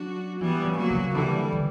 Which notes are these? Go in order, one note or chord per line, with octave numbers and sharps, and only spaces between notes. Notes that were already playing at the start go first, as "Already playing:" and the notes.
Already playing: F#3 D4 F#4
E3 G3 B3
C#3
F#3 A#3
C#3
D3 E3 G3
D3